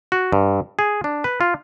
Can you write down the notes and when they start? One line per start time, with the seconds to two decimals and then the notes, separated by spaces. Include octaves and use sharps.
0.12 F#4
0.32 G2
0.79 G#4
1.04 D4
1.24 B4
1.41 F4